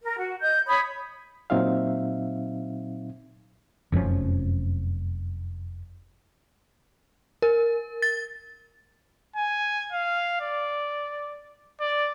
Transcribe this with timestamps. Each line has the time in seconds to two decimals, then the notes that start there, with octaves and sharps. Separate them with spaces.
0.02 A#4
0.17 F#4
0.41 D#5 G6
0.67 C#5 B5 D#6
1.50 A#2 F#3 C4 D#4 E5 F5
3.92 F1 F#2 F3 C#4
7.42 A#4
8.02 A6
9.36 G#5
9.93 F5
10.41 D5
11.81 D5